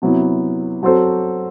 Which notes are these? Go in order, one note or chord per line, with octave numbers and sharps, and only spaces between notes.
C3 F#3 B3 E4
F#3 C4 F#4 A4 C5